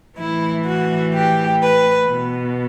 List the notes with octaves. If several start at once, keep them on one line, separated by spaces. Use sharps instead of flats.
A2 E3 E4
F#4
G4
B4
B2